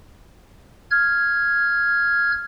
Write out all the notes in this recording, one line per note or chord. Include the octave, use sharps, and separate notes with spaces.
F6 G#6